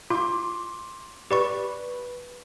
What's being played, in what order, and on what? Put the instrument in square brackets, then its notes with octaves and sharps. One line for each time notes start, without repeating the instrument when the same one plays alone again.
[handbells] F4 [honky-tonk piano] C6 D6
[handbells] G4 D5 C#6 [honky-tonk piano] B4